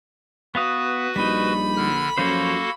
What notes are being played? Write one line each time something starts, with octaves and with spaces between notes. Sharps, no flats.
B3 F#4 B4 F5 D#6
A#1 G3 D#4 B5
D3 F6
F#2 F3 A#3 C#4 F#4 A4 C5